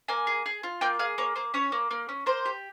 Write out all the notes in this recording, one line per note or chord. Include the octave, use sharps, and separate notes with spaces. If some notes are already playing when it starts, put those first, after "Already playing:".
A#3 G#5
G#4
G#4
F4
A#3 G5
G#4 F5
A#3 C#5
A#3 C5
C#4 C#5
A#3
A#3
C#4
A#3 C5
G4